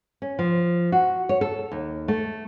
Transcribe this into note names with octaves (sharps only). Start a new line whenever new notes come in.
C#4
F3
F#4
C#5
A4
D#2
A3